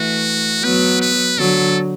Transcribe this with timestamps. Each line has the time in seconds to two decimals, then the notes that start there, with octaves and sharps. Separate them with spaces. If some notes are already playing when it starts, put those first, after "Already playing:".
Already playing: E3 A3 F#4
0.63 F#3 B3 B4
1.01 B4
1.38 D3 F#3 A4